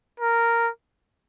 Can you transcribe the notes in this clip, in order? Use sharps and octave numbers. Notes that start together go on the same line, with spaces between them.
A#4